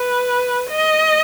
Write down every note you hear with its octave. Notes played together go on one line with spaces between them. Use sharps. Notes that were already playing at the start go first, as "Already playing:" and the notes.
Already playing: B4
D#5